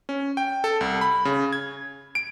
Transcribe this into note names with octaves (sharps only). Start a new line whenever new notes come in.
C#4
G5
A4
C2
B5
C#3
G#6
D7